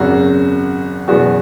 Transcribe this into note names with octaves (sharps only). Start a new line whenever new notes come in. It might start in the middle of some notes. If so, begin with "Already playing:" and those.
Already playing: G#1 F#2 C#3 F#4
F#1 E2 B2 F#4